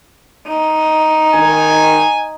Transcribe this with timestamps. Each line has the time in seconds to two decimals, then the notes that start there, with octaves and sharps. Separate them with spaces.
0.49 D#4
1.34 D#3 G#5